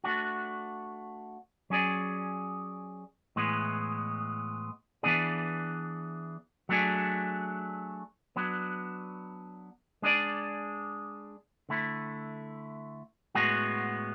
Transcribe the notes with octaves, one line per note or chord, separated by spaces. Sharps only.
A3 D4 F#4
F#3 C#4 G#4 D5
A2 E3 G#3 B3
E3 B3 D4 G#4 D5
F#3 A3 D4 G#4
F#3 B3 D4
G#3 D4 G#4 D5
D3 A3 E4
A2 G#3 B3 F#4